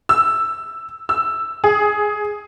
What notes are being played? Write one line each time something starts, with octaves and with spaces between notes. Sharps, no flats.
E6
E6
G#4